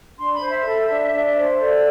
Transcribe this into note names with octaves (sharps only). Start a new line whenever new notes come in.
D4 C6
B5
C5
E5
A4
D4
D4
C5
A4 D5